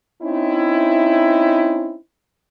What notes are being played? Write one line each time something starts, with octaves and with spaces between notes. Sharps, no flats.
C4 C#4 D#4 E4